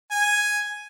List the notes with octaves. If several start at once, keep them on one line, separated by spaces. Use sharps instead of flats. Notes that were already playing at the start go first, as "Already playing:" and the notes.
G#5